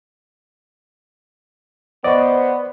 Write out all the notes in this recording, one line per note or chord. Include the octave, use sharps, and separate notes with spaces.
B3 C5 D5 D#5 C#6